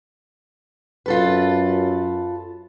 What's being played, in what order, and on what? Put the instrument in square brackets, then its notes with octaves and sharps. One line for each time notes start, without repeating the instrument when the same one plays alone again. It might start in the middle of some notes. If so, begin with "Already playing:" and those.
[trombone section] F#2 [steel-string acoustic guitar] F4 A4 B4